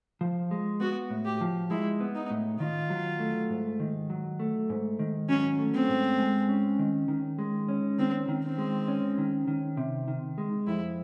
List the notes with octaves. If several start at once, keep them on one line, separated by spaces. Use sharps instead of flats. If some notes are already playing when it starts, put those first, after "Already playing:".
F3
G#3
B3 F#4
A2
G4
F3
G#3 E4
B3
D#4
A2
D#3 F4
F#3
A3
G#2
D#3
F#3
A3
G#2
D#3
F#3 C#4
A3
C4
G#2
G#3
C#4
D#3
D#3
G#3
C#4
D#3 C4
D#3
C4
G#3
C#4
D#3
D#3
C3
D#3
G#3
F2 E4